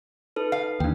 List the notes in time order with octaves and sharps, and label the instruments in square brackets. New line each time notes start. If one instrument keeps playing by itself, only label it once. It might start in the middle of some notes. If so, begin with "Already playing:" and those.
[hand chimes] D#4 A4 B4
[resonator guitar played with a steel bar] F5
[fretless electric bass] D#2 [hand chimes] D4 G5